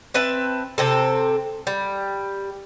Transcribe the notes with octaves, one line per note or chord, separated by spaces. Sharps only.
C4 B4 E5 A5
C3 C4 A4
G3